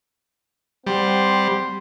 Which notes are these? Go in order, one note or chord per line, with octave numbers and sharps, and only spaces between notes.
G3 C4 F#5 C6